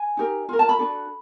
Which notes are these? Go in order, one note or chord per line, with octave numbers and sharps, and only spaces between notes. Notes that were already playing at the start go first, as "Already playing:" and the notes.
Already playing: G#5
D#4 G4 A#4
F4 A#4
A5
B5
D4 F#4 A4